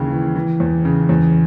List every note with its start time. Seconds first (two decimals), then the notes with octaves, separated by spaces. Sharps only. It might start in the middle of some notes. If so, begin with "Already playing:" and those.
Already playing: D#2 C#3 E3
0.11 E3
0.36 E3
0.60 E2
0.85 C#3
1.09 E2